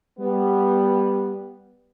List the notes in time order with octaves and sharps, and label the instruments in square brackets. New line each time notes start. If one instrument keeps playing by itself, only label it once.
[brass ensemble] G3 B3